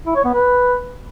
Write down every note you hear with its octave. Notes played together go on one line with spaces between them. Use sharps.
E4
C#5
B3
B4